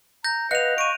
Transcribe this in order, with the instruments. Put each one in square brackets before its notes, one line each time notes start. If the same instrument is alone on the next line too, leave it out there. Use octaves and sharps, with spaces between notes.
[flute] A#5 [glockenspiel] G6 A#6
[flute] B4 [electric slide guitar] D#5 F5 F#5 [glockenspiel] F#6 F7
[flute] C#6 [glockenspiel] D7 D#7